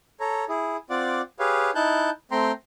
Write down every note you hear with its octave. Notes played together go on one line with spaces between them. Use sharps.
A4 C#5 A#5
E4 G#4
C4 F4 D5 F#5 D6
G4 G#4 B4 C#5 F5
D#4 E4 A5 F#6 G6
A3 C4 G5 A#5 C6